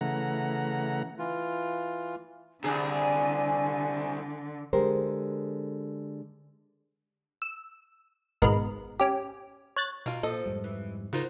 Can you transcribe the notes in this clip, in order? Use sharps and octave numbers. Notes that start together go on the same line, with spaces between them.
C#3 E3 A3 F#5 A#5
E3 F4
C2 F#2 D3 D4 G#4 G#5
D3 G#3 G4 A#4 C5
E6
G#1 B2 G#3 A#4 B4
C#4 G4
C#5 F#6 A6
B2 F4 A#4
A#2 F3 A4 D#5 A5
F2 G#2 G3
E3
C#3 D#4 F4 F#4 A#4 C5